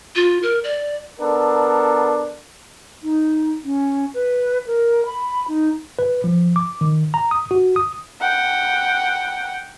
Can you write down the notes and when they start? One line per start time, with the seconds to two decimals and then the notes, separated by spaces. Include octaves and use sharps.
0.16 F4
0.43 A#4
0.64 D5
1.20 B3 D4 A4 A#4
3.03 D#4
3.64 C#4
4.14 B4
4.67 A#4
5.06 B5
5.48 D#4
5.99 B4
6.24 F3
6.56 D6
6.81 D#3
7.14 A#5
7.31 D#6
7.51 F#4
7.76 D#6
8.21 F#5 G5